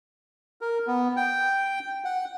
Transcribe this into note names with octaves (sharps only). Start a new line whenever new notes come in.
A#4
B3
G5
F#5